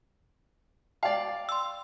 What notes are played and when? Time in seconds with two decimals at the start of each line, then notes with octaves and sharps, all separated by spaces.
1.03 D5 F5 G5
1.49 C6 E6